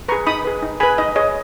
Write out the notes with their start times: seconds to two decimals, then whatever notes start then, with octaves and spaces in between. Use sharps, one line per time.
0.08 G#4 B4 A#5 C#6
0.27 D#4 B5 D#6
0.45 G#4 B4
0.62 D#4
0.80 G#4 B4 G#5 B5
0.98 D#4 D#5
1.16 G#4 C#5 D#5